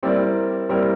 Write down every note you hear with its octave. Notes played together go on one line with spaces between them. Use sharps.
G3 C4 E4 A#4 D5
G3 C4 E4 A#4 D5